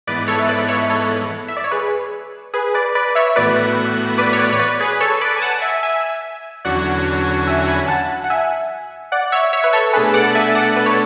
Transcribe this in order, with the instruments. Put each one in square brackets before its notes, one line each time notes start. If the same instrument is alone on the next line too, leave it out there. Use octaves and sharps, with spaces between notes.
[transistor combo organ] G#2 E3 B3 [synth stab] B4 D5
[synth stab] A4 C#5
E5
B4 D5
C#5 E5
A4 C#5
E5
D5
C#5
G#4 B4
G#4 B4
B4 D5
B4 D5
C#5 E5
[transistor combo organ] A2 E3 B3 F#4 [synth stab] B4 D5
[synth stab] B4 D5
C#5
B4 D5
C#5
B4 D5
G#4 B4
A4 C#5
B4 D5
G#5
F#5 A5
E5 G#5
E5 G#5
[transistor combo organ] E2 D3 F#3 C#4 F#4 [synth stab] D5 F#5
[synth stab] E5 G#5
G#5 B5
F#5 A5
F#5
E5 G#5
D5 F#5
C#5 E5
C#5 E5
B4
A4 C#5
[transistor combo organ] B2 A3 D4 A4 [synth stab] G#4 B4
[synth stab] D5 F#5
E5 G#5
D5 F#5
B4
C#5